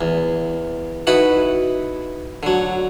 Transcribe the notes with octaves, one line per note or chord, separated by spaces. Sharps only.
E2
D#4 E4 F#4 B4 A5 B5
D3 F#3